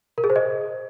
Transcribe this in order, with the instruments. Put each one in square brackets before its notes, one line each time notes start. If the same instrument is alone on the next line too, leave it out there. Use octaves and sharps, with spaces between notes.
[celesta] A#4
G#4
C5
D#5